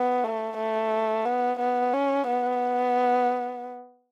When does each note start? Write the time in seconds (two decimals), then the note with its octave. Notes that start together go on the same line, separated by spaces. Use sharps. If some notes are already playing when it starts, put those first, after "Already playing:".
Already playing: B3
0.24 A3
0.58 A3
1.25 B3
1.60 B3
1.93 C#4
2.28 B3